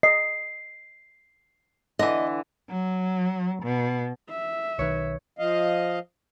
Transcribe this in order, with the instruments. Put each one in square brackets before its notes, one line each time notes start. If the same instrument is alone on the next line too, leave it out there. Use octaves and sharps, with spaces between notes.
[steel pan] D#5 [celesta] C7
[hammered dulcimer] D3 E3 [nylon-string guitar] D#5
[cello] F#3
B2
[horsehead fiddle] E5
[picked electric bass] B1 D#3 [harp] B4 C#5
[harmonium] F3 D#5 F5